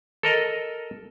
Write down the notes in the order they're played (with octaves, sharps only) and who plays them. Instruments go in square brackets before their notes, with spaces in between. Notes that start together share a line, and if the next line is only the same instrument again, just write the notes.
[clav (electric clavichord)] A4 A#4 D#5